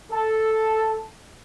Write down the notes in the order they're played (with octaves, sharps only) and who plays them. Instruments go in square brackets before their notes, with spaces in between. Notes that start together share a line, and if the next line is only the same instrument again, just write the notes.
[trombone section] A4